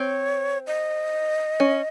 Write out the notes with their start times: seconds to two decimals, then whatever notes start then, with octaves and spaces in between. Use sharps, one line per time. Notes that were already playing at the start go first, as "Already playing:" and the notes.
Already playing: C4 C#5
0.67 D#5
1.60 C#4